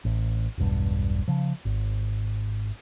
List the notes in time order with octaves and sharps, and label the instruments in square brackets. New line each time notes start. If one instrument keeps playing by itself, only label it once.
[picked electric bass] A1
E1 B1 G2
C#3 F3
G#1